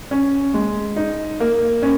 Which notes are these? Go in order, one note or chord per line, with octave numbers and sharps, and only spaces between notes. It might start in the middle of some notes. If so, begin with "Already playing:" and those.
C#4
G#3
D#4
A#3
C#4